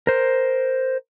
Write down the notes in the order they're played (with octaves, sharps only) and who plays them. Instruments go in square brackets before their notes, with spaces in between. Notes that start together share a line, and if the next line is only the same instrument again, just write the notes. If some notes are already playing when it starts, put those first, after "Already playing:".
[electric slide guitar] A#4 C5